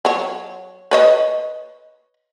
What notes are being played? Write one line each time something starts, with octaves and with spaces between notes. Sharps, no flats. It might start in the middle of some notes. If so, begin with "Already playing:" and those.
F#3 C#5
B4 C#5 D#5